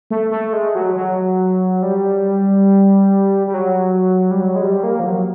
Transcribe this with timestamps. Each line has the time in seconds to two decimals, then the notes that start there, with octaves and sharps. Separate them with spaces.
0.11 A3
0.31 A3
0.53 G#3
0.75 F#3
0.96 F#3
1.83 G3
3.47 G3
3.54 F#3
4.31 G3
4.41 F#3
4.56 G#3
4.62 G3
4.83 A#3
5.00 F3
5.05 F#3